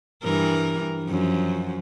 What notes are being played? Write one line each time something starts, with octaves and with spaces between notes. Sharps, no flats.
G2 E3 A#4
F#2 F3